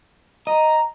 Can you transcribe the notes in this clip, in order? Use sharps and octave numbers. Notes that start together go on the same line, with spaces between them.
D#5 A#5